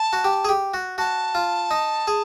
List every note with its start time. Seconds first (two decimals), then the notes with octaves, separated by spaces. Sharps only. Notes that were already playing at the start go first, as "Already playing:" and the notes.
Already playing: A5
0.13 F#4
0.24 G4
0.45 G#4
0.49 G4
0.74 F#4
0.98 F#4 A5
1.35 F4
1.71 D#4
2.07 G#4